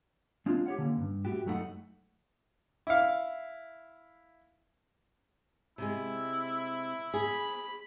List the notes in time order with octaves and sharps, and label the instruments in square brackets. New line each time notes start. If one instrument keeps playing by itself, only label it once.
[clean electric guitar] G#3 C4 D4 F4
G4 C#5 F#5
D3 A#3 C#4
G2
A2 F#4 G4
F#2 G#3 A3 D#4 A4 F#5
[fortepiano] E4 F5
[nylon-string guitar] C3 G#3 [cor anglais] E4
[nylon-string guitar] G#4 [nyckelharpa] B5